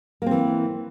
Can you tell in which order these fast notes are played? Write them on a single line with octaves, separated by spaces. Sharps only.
A#3 C4 E3